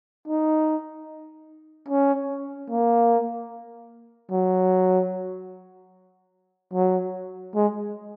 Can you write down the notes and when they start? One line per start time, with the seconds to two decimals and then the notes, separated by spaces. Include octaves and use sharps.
0.28 D#4
1.88 C#4
2.70 A#3
4.31 F#3
6.73 F#3
7.55 G#3